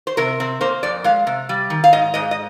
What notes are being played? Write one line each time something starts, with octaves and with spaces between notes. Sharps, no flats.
C5
C3 A#4
C4
A#3 C5
F2 D5
G#3 F5
C3
G3
D#3
F5
G#2 D#5
G#2 D#5
D#5